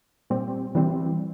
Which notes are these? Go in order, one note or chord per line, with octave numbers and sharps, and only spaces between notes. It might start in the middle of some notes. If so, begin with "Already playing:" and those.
A#2 G3 C4
E3 G3 C4